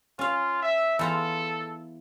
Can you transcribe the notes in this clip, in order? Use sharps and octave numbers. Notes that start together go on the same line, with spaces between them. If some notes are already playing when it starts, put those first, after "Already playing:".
C#4 F4 F5
E5
E2 F4 A4 A#5